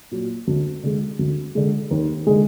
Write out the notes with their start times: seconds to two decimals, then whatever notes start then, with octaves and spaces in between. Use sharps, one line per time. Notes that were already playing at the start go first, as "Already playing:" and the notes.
0.11 A#2 F#3
0.47 D2
0.83 D3 G#3
1.19 D2
1.55 D3 G#3
1.91 D#2
2.27 D3 G#3